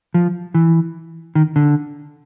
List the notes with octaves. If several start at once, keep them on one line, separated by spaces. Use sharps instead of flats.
F3
E3
D#3
D3